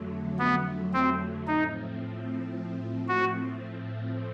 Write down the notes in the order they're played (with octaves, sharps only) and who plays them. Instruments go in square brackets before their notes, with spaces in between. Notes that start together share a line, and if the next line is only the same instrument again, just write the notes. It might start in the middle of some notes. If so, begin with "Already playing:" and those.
Already playing: [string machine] F2 D3 F#3 A3
[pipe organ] B3
C4
[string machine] A2 F3 A3 C4 [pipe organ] D#4
[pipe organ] F#4